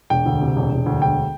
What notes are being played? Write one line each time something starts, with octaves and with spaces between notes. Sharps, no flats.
E1 G5
D2
C3
E1
E1
D2
E1 G5